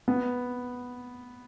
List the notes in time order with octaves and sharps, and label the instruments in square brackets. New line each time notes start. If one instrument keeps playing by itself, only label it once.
[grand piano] B3